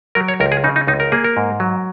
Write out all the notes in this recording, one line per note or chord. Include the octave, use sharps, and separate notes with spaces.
F#3 A#4
C#5
C#2 A#4
G#4
C#3 D#4
D#4
C#2 D#4
A#4
A#3 G#4
A#4
G#2
F#3